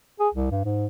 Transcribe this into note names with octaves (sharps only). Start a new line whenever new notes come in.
G#4
C2
G2
G#2